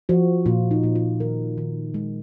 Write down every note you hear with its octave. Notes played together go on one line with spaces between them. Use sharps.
F3 F#4
A#2 F4
D#4
A#2
F4
D#3 A#4
D#3
G#3